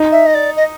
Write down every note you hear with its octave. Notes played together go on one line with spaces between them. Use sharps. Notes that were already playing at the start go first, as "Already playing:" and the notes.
Already playing: D#4
E5
D#5
D5
D#5